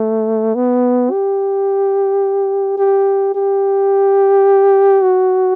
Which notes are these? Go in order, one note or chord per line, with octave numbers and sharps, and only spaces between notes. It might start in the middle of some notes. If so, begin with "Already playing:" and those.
Already playing: A3
B3
G4
G4
G4
F#4